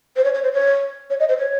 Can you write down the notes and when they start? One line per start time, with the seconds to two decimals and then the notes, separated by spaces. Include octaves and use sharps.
0.16 C5
0.24 C#5
0.34 C#5
0.43 C5
0.53 C#5
1.10 C#5
1.20 D#5
1.29 C5
1.38 C#5